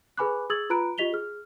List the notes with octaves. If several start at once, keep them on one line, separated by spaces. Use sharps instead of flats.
G#4 B4 G#5 B5 D6 F#6
G#4 D#6 E6 G#6 A6 F#7
F4 B4 A#5 B5 F#6 D7
F4 G4 D#5 B6 F7 G7
G#4 F6